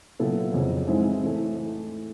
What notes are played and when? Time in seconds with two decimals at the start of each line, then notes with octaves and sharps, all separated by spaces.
0.19 A#2 F#3 B3 E4 A4
0.54 F2 C#3 F#3
0.87 G#2 E3 G#3 C4 E4
1.21 A2 E3 A3